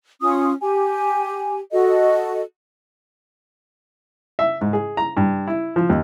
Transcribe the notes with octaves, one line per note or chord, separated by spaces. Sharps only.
C#4 F4 D#6
G4 G#5
F#4 A4 D#5
E5
G#2
G#4
A#5
G2
E4
F3
D#2